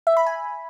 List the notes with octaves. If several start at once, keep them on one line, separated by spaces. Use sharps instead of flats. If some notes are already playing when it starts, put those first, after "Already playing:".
E5
B5
G#5